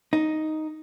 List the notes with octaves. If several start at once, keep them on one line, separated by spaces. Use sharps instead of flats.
D#4